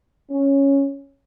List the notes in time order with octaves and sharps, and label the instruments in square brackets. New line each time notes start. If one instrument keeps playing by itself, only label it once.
[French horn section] C#4